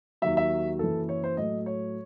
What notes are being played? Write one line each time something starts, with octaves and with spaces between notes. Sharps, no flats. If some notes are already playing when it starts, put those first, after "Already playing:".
D#2 D#3 F#3 E5
E5
F#1 F#2 E3 A4
C#5
C5
A2 F#3 A3 D#5
C#5